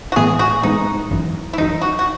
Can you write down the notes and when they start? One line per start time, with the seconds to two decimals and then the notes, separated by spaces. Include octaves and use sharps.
0.12 F#4
0.16 A2 E3 G#3 B3 G#4
0.39 F#4
0.63 A2 E3 G#3 B3 D#4
1.11 G#1 F#2 E3
1.53 E4
1.58 G#1 F#2 E3 D#4
1.81 F#4
1.99 F#4